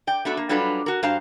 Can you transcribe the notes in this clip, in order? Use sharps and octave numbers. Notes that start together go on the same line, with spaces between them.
D5 G5
A3 B3 D4 F#4 A4
A#3
F#3 G3 D4 F4 A4 B4
F#4 A#4
G2 F#4 C5 F5 A5 A#5